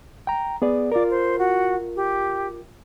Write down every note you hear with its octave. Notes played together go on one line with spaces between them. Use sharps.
G5 A#5
B3 G#4 D5
F4 A#4 D5
C5
F#4
G4